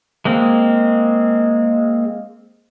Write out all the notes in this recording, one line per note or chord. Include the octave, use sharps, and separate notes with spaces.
G#3 A#3 C4